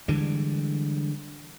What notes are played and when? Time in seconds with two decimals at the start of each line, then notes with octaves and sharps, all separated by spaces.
0.08 D3 E3 G3 G#3